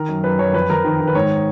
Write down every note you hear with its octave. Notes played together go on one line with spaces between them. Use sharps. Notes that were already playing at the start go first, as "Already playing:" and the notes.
Already playing: D#3 A#4
F#2
F#2 B4
F#2 C#5
F2 B4
F2 A#4
D#3
D#3
B4
G#2 C#5